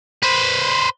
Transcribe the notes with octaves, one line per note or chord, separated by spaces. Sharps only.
B4 C5